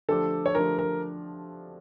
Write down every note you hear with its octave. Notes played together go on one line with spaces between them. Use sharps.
D3 F3 A3 D4 G4 A4
C#5
D3 F3 A3 D4 G4 A#4
A#4